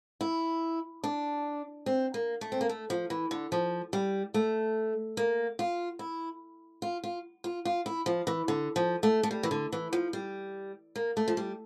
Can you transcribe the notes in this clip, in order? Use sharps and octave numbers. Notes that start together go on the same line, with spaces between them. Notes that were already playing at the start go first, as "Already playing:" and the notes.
E4
D4
C4
A#3
A3
C4
A#3
A3
F3
E3
D3
F3
G3
A3
A#3
F4
E4
F4
F4
F4
F4
E4
F3
E3
D3
F3
A3
A3
G3
E3
D3
E3
F3
G3
A#3
A3
F3
G3